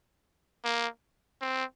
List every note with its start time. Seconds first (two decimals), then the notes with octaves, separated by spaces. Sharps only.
0.65 A#3
1.41 C4